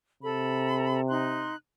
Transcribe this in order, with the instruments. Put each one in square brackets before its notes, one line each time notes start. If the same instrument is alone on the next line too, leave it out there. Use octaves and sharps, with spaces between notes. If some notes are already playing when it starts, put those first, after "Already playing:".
[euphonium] C3 [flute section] A4 B5
[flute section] D#4 C6 F#6